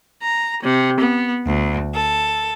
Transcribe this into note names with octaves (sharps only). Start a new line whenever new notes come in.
A#5
C3
B3
D2
A4